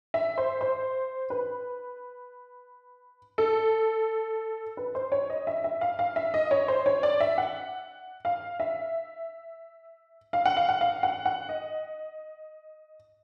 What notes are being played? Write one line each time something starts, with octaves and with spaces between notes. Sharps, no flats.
E5
C5
C5
B4
A4
B4
C5
C#5
D#5
E5
E5
F5
F5
E5
D#5
C#5
C5
C#5
D5
E5
F#5
F5
E5
F5
F#5
F5
F#5
F5
F#5
F#5
D#5